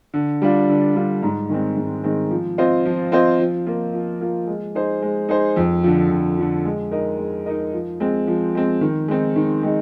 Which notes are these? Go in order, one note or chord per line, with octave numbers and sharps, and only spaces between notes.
D3
G3 D4 F4
D3
G3 D4 F4
G#2
D#3 G#3 C4
G#2
D#3 G#3 C4
F3
C4 F4 C5 D#5
F3
C4 F4 C5 D#5
F3
A#3 F4
F3
A#3 F4
G#3
D#4 G#4 C5
G#3
D#4 G#4 C5
F2
D3 F3
F2
D3 F3
G#3
D#4 A#4 D#5
G#3
D#4 A#4 D#5
F3
G#3 C4
F3
G#3 C4
D#3
G#3 C4 D#4
D#3
G#3 C4 D#4